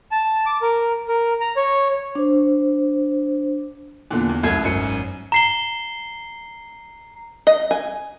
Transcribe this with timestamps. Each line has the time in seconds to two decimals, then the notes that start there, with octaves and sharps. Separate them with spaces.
0.12 A5
0.46 D6
0.62 A#4
1.08 A#4
1.41 A#5
1.56 C#5
2.15 D4 C5
4.11 E2 A#2 D3
4.29 E2
4.43 C2 F#2 A3 G#6
4.64 G#1 F#2 C#7
5.32 A#5 C7 G7
7.47 D#5
7.71 G#5